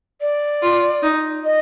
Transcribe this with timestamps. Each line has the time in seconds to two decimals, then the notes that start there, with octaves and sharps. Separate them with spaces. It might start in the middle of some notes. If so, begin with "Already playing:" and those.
0.21 D5
0.62 F4
1.03 D#4
1.44 D#5